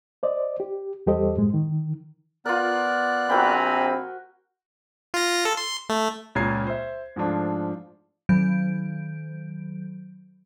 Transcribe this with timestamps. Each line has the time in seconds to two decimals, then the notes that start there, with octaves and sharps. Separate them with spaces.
0.23 C5 D5 D#5
0.60 G4
1.07 E2 G3 G4 A4 C5 D#5
1.36 F#2 A2 G#3
1.54 D#3
2.45 B3 F4 A#4 D5 F#6
3.30 A#1 C4 F#4 A#4 G5 G#5 A#5 B5
5.14 F4 A#6
5.45 A4
5.57 C6
5.89 A3
6.35 C#2 A#2 C#4 A#5 G#6 C7
6.67 C5 E5
7.16 G#2 F3 A3 D4 F4
8.29 D#3 F#3 G6 D7